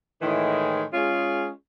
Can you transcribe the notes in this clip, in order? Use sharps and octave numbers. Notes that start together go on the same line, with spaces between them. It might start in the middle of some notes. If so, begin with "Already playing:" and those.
A2 D#3 E3 G#3
G#3 C#4 F4 G#4